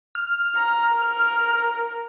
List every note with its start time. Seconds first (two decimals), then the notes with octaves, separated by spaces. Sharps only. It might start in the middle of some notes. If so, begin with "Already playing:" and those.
0.15 F6
0.56 A#5
0.95 A#4